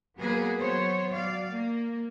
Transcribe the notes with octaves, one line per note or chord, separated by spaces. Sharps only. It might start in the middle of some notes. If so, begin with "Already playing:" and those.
F#3 A#3 B3 G#4 B4
F#3 B3 C5 C#5
F#3 D5 F5
A#3